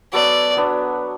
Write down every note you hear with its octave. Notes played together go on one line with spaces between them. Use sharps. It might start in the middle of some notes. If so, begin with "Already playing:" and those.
F#3 B3 F#4 A4 D5
F#3 B3 D4